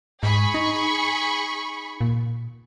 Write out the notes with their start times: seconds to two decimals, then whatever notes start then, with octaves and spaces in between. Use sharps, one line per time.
0.23 G#2 G#4 B5 C#6
0.54 D#4
2.01 A#2